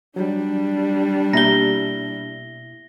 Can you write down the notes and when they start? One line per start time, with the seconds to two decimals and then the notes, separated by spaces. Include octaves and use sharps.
0.16 F#3 G3 D4
1.33 B2 A#3 E4 G4 E5 A#6 G7